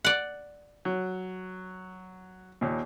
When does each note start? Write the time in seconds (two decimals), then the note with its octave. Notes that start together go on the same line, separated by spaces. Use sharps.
0.05 D5 F#5
0.85 F#3
2.61 D#2 A#2